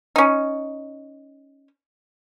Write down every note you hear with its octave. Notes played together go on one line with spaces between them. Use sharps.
C#4 D#4